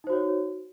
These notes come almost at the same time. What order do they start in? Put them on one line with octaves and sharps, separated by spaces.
D#4 C5 F#4 C#5